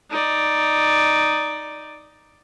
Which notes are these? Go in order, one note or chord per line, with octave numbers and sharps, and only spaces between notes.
D#4 D5